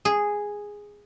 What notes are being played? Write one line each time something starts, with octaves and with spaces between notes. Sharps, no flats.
G#4